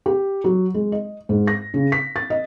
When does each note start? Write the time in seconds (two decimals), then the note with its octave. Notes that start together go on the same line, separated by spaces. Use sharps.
0.06 G4
0.44 F#3
0.74 G#3
0.92 D#5
1.29 G#2
1.47 A#6
1.74 C#3
1.92 B6
2.16 A6
2.30 D#5